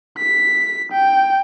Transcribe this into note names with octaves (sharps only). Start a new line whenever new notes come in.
B6
G5